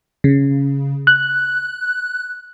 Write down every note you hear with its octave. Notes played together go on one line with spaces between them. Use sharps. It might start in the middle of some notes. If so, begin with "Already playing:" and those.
C#3
F#6